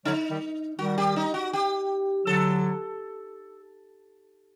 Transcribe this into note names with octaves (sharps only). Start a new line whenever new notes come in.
D3 F#3 D#4
D#3 G3
D#3 G3 F#4
G4
D#4
F#4
G4
D3 F#3 A4